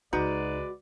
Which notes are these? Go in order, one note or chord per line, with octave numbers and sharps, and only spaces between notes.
C#2 G#3 D#4 F#4 B4 D5